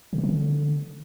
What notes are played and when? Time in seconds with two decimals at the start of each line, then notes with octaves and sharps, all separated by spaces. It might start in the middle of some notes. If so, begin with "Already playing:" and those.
0.13 C3
0.18 D3
0.24 E3
0.29 D3